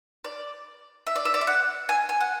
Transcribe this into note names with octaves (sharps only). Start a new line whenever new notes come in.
D5
E5
D5
E5
D5
E5
F#5
G#5
G#5
F#5